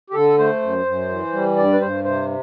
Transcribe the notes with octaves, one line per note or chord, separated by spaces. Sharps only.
G4
D3 A4
A3 C5
F#2
F#2
E3
G3
G2 D5
B4
G2 C5
C3 C5